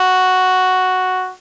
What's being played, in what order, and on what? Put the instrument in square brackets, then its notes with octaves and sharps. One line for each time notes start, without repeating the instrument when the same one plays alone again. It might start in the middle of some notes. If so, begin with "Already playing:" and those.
Already playing: [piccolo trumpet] F#4